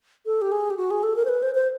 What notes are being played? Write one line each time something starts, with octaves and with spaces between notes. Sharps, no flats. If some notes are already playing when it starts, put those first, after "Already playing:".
A4
G4
G#4
G4
F#4
G#4
A4
A#4
C5
B4
C5
C5